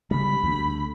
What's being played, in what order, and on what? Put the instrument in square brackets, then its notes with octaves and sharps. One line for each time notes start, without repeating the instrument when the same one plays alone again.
[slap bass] C#3 G3 [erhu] B5
[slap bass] D2